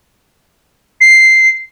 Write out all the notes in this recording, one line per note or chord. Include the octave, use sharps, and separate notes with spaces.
C7